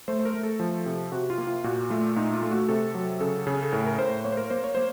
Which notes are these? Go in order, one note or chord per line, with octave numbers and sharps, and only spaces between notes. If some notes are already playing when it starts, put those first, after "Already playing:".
A3 C5
C5
A#4
A3
A4
F3
C3
C3 F#4
F4
A#3
F4
A#2 F#4
A3 F4
A#2 D#4
F4
A3
F#4
C3 A4
F#3
C#3 A4
C#3
A4
A2 A#4
A#4
A2 C5
A#3 C#5
C5
A#4
A#3 C5
C#5
A#3 C5